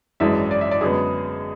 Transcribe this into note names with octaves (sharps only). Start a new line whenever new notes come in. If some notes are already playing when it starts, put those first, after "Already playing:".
G#1 F#2 E3 G#3 D4 E5
D5
E5
D5
F#2 D3 G#3 B3 G#4